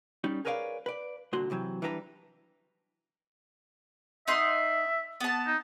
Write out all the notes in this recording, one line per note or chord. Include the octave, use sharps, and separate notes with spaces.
G3 C#4 D#4
G#4 A#4 B4 C#5 D5 F5
B4 D5
C2 A#2 D3 F#4 C6
C3 E3 F#3 C4
E3 G3 D4 B4 C#5 A#5
D#4 E5 F#5 C6
B3 A5
D#4